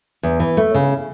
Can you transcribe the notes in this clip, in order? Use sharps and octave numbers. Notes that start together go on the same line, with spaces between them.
E2
E3
A3
C#3